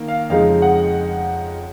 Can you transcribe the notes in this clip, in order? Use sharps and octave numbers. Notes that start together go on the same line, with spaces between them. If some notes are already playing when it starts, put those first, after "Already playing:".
Already playing: D#3 A#3
F5
F2 C#3 G#3 D#4 F5
F#5